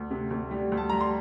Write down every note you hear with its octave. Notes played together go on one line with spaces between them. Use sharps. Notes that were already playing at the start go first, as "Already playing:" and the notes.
Already playing: D2
C3
D2
G3
D2
A5
G3 A#5
C6